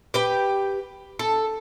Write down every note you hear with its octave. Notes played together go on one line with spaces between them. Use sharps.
G4 B4 G5
A4